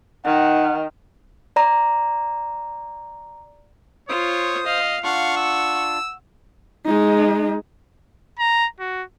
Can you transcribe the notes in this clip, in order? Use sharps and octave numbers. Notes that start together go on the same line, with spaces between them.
D#3 F#5
D5 A#5
F4 C5 C#5 D#6
D#5 F5
D4 F4 F5 F#5 C#6
E6
G#3 D#4
A#5
F#4